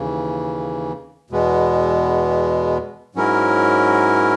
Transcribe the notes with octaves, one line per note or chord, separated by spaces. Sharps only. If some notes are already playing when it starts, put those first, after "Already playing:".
Already playing: D#2 C#3 E3
E2 B2 G#3 B3
G#2 F#3 C#4 E4 A#4